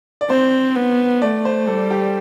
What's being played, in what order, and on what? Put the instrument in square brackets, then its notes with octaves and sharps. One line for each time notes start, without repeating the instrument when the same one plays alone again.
[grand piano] D5
[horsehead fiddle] C4 [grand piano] C5
[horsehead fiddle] B3
[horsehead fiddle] A3 [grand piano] D5
[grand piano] C5
[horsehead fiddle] G3 [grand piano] A4
[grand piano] G4